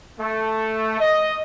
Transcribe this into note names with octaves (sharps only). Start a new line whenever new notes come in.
A3
D#5